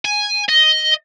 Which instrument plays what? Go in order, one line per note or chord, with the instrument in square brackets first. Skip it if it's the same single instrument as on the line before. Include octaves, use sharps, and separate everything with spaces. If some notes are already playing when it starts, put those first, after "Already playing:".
[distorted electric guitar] G#5
D#5